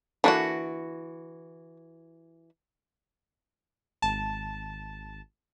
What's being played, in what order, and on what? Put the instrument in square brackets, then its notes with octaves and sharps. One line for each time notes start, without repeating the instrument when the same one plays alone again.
[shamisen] D3 A#3 D4 [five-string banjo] E3 F#4
[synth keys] G#1 A5